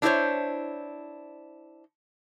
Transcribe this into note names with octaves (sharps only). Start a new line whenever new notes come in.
D4 E4 G4 A4 C5 C#5